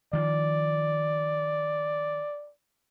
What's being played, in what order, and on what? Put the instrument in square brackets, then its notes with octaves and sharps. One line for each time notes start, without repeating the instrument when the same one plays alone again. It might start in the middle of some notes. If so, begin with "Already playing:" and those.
[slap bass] D#3 F3 [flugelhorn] D5